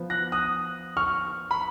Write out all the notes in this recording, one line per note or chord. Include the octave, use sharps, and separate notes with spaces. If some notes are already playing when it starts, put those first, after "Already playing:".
Already playing: F3 B3
F#6 A#6
D#6 F#6
C#6 F6
B5